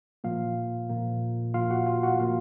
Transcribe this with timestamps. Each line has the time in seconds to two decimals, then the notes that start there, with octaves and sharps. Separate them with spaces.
0.24 A#2 F3 A#3 F4 F5
0.89 A#2 F3 A#3
1.54 A#2 F3 A#3 F4 F5
1.71 F#4 F#5
1.86 F4 F5
2.03 F#4 F#5
2.20 A#2 F3 A#3 F4 F5